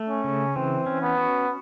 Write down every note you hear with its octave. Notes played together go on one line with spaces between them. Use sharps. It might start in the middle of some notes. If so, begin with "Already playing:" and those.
Already playing: A3
C#4
C#3
E3 C4
C#4
B3
F#4